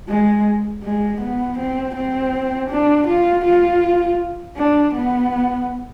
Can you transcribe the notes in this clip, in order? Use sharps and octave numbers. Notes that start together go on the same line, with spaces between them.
G#3
G#3
B3
C4
C4
D4
F4
F4
D4
B3